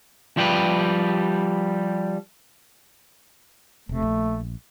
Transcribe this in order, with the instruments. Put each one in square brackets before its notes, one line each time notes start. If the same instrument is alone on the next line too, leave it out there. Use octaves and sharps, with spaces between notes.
[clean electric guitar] F3 G3 G4 B4
[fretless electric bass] E1 C3 [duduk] A3
[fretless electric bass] A#1